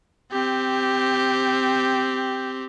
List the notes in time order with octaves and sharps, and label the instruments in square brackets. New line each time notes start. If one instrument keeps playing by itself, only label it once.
[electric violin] C4 G4